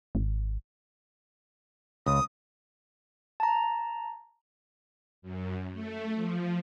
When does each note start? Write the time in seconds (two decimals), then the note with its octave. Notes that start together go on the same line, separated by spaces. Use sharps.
0.15 G#1
2.06 C#2 D#6
3.40 A5 A#5
5.22 F#2
5.73 A3
6.15 F3